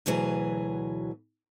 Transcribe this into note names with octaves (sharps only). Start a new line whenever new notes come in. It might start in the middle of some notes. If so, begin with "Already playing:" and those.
D2 B2 E3 F#3 G#4